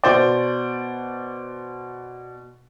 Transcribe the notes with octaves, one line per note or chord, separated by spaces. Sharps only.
B2 C5 D5